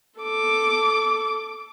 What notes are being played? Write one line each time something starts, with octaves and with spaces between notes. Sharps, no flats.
A4 D6